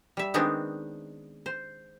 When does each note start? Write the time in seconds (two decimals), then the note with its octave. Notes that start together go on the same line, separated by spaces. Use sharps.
0.17 G3 E5
0.34 D#3 G#3 B3 C4 D4 D#4
1.46 C5